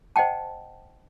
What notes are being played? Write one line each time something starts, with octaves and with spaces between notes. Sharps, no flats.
C5 D#5 F#5 G5 A5